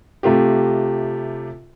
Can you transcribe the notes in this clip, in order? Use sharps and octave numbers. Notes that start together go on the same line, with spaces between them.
C3 A3 F4 G4